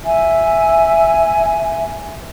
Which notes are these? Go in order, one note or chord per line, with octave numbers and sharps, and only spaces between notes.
E5 G#5